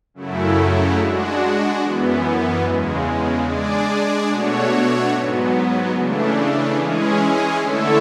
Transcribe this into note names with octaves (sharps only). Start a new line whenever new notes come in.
F#2 C#3 F#3 A3 E4
G#3 D4 F#4
F#2 E3 B3
E2 C#3 G#3
G#3 D4 G#4 D5
B2 A3 D4 F#4 C#5
G#2 F#3 B3
C#3 E3 A3 D4
E3 G#3 C#4 G#4
D3 A3 E4 A4 C#5